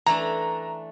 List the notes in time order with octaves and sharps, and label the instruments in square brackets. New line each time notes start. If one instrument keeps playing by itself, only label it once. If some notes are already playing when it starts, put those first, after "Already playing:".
[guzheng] E3 A3 D4 [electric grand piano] A#5